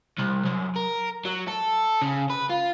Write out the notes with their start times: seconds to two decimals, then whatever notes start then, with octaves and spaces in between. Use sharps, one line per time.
0.18 C2
0.45 F#2
0.76 A#4
1.25 F#3
1.48 A4
2.02 C#3
2.30 B4
2.50 F4